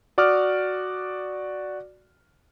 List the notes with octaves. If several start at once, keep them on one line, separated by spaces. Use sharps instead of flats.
F#4 D5 D6 D#6 F6